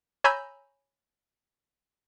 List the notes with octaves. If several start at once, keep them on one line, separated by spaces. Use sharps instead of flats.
C#5 G#5 A#5 B5 E6 G6